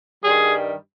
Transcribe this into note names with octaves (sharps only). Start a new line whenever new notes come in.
G2 D#3 G3 G#4